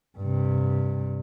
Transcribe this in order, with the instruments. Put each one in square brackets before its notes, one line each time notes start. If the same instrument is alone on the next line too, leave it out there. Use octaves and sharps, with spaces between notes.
[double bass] G2 C3